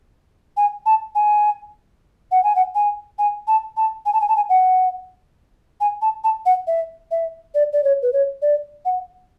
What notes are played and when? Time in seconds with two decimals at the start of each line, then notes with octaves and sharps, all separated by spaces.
0.57 G#5
0.86 A5
1.15 G#5
2.31 F#5
2.44 G#5
2.56 F#5
2.75 G#5
3.18 G#5
3.47 A5
3.77 A5
4.06 G#5
4.13 A5
4.21 G#5
4.28 A5
4.36 G#5
4.49 F#5
5.81 G#5
6.02 A5
6.24 A5
6.46 F#5
6.67 E5
7.11 E5
7.54 D5
7.73 D5
7.84 C#5
8.02 B4
8.13 C#5
8.42 D5
8.85 F#5